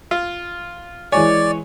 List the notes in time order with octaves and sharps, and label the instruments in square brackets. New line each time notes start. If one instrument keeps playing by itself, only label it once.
[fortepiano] F4
[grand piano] E3 G#3 G#5 [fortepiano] C#5 [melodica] D5